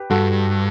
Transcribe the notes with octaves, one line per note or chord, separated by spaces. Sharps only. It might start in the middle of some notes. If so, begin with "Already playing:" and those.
Already playing: G4 B4
G2 F#4 A4